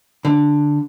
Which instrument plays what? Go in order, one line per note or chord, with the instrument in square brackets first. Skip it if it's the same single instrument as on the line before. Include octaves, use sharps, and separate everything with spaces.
[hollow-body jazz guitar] D3